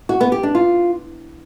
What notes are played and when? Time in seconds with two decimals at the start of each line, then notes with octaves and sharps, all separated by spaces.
0.09 F#4
0.21 B3
0.32 G4
0.43 D4
0.55 F4